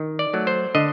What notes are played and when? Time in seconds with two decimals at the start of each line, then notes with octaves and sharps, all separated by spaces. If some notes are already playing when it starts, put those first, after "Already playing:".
Already playing: D#3
0.19 D5
0.33 F#3 A3
0.47 C5
0.75 D3 D#5